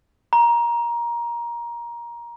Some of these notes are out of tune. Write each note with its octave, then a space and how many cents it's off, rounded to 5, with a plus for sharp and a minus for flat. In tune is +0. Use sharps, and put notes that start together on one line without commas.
A#5 +20